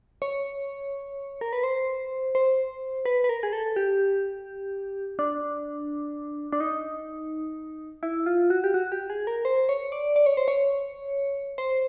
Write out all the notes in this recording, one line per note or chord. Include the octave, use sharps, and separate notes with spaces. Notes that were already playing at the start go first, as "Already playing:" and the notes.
C#5
A#4
B4
C5
C5
B4
B4
A#4
G#4
A4
G4
D4
D4
D#4
E4
F4
F#4
G4
F#4
G4
G#4
A#4
C5
C#5
D5
D5
C#5
C5
C#5
C5